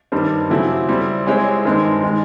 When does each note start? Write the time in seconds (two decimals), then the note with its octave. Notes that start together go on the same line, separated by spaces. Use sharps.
0.12 G2 D#3 G3 C4
0.50 C#3 F#3 A3 C4 E4
0.89 G3 C4 E4
1.27 G#3 C4 E4 G#4 C#5
1.65 G2 D#3 G#3 C4
2.03 D#3 G#3